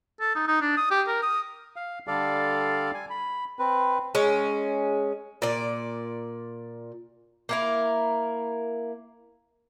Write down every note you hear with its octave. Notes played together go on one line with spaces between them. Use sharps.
A4
D#4
D#4
D4
D#6
G4
A#4
D#6
F5
D3 G3 A4 D5 F5
G#5
B5
C4 B4
G#3 C#4
A#2 D5
A#3 E4 A#4